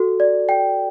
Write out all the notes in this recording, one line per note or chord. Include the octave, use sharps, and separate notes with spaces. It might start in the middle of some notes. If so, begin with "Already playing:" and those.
Already playing: F#4 A4
D5
G5